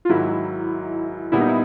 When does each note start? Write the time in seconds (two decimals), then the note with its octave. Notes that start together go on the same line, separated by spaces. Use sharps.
0.05 F4
0.09 G#2 D#3 F#3 A#3 E4
1.32 A#2 G3 B3 E4
1.41 D#4
1.48 E4